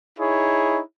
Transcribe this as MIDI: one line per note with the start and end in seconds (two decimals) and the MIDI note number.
0.19 0.81 63
0.19 0.81 64
0.19 0.81 68
0.19 0.81 73